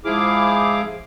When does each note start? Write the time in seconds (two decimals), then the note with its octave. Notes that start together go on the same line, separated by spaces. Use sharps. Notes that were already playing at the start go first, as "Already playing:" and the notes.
0.05 G#2 F3 E4 G#4 F5 D6